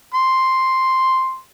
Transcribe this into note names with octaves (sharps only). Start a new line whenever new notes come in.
C6